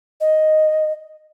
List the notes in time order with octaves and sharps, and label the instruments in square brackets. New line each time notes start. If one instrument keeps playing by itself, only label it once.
[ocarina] D#5